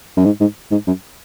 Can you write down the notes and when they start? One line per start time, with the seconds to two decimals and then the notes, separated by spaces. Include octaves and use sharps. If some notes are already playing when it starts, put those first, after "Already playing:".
0.17 F#2
0.25 G#2
0.41 G#2
0.71 G#2
0.87 F#2